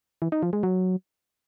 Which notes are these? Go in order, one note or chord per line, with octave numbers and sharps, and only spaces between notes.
E3
D#4
F3
G#3
F#3